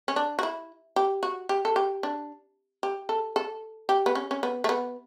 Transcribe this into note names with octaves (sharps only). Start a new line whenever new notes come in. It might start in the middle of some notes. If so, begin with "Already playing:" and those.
C#4
D4
F#4
E4
G4
F#4
G4
A4
G4
D4
G4
A4
A4
G4
B3
C#4
C#4
B3
A3
B3